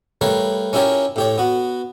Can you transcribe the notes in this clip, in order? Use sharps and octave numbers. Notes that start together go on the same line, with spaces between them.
G3 A3 A#4 B4 C#5 F5
C#4 E4 F4 G4 A#4 C#5
A2 G4 C#5
B3 F#4